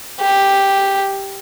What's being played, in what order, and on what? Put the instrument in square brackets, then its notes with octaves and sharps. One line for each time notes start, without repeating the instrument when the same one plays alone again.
[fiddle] G4